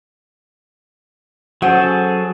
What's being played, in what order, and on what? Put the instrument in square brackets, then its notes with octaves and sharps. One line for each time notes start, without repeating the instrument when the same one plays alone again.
[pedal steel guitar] F#3 G#4 A4 [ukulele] C#4 C5 F#5